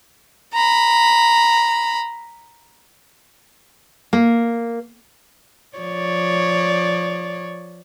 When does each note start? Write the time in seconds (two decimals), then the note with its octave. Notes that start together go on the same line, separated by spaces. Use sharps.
0.54 A#5 B5
4.13 A#3
5.77 F3 C#5 D5